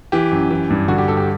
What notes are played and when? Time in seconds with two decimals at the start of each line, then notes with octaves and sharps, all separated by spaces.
0.12 E3 G4
0.32 F#2
0.50 E3
0.70 G2
0.88 D3 F#4
0.98 G4
1.08 G2 A4
1.17 G4